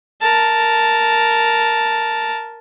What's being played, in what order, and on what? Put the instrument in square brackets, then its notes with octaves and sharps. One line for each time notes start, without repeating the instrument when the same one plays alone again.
[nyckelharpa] A#4 A5